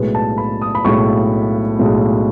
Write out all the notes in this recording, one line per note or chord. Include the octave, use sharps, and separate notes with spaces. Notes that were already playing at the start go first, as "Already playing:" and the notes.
Already playing: B1 A2 G#3 B4
A5
B5
D#6
B5
B1 A2 G#3 C#6
B1 A2 G#3